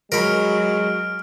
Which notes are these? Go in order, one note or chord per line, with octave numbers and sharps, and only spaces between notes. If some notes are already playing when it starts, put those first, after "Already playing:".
F#3 G#3 A#4 B5 F6 D7